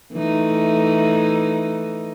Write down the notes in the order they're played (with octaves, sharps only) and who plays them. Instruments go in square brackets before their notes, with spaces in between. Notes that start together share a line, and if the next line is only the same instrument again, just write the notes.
[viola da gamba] E3 A3 D#4